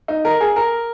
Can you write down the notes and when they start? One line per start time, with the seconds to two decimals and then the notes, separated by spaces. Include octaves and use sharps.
0.08 D#4
0.25 A#4
0.41 G#4
0.56 A#4